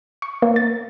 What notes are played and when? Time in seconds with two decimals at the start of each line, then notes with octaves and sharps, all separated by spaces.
0.22 C#6
0.42 A#3
0.56 A6